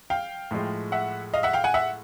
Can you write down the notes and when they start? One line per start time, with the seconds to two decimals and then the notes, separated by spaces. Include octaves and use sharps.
0.10 F5 G5
0.51 A2 F3 G#3
0.92 E5 F#5
1.34 D#5 F5
1.43 E5 F#5
1.53 F5 G5
1.64 F#5 G#5
1.74 E5 F#5